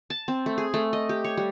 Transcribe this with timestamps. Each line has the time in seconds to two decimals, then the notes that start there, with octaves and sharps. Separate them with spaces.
0.10 A5
0.28 C4
0.46 A3
0.58 G#4
0.74 A3
0.93 D#5
1.09 G4
1.24 C#5
1.37 G3